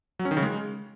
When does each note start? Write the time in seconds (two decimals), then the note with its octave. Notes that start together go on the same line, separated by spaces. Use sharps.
0.19 F#3
0.25 C#4
0.31 D#3
0.37 C#3
0.43 G#3